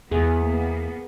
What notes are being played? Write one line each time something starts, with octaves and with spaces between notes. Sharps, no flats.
E2 B3 G#4
A#3 B3